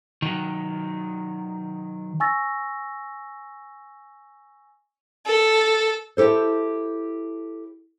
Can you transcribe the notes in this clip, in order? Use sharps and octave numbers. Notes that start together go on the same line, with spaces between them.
D#3 F#3
G#5 C#6 E6 A6 A#6
A4
E4 G4 A4 C5